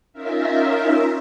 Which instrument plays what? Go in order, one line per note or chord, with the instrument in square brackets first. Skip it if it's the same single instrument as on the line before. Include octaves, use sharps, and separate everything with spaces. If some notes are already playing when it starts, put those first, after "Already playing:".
[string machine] C#4 D#4 F4 A#4 E5